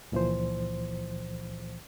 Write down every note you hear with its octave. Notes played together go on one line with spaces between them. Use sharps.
C#2 A#2 E3 F3 C5